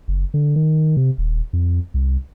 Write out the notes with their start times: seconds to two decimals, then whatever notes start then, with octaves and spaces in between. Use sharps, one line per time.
0.08 F#1
0.34 D3
0.56 D#3
0.97 C3
1.18 D#1
1.53 F2
1.94 C2